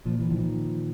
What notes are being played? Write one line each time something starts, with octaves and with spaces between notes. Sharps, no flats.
A#2 F3
E3
D#3 F3